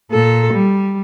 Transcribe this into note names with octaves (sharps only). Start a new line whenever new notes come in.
A#2 A4
G3